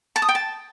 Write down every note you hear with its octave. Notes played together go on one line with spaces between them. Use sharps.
A5
D#6
G5
A5